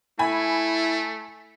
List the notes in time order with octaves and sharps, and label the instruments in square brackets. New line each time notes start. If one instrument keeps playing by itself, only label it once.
[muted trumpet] A3 [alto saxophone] E4 [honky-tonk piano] G#5 B5